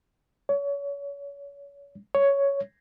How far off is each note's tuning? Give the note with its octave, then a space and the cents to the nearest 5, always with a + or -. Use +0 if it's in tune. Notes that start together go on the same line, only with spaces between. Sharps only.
C#5 +30
C#5 +5